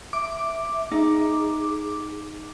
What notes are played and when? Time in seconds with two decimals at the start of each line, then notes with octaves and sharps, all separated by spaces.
0.13 E5 D6
0.91 D#4 G#4